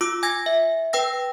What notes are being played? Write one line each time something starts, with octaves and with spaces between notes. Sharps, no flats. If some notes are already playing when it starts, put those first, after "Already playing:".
F4 D6 E6
G#5 G#6 A#6
E5
B4 G5 E6 A#6